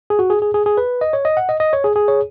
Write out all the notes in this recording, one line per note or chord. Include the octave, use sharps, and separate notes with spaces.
G#4
F#4
G#4
G#4
G#4
G#4
B4
D#5
C#5
D#5
F#5
D#5
D#5
C#5
G#4
G#4
C#5